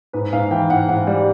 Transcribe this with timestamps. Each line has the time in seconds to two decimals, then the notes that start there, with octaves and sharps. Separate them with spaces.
0.13 G#2 B4
0.33 G#2 F5
0.51 E3 G5
0.70 G#2 F#5
0.89 G#2 F#5
1.07 G3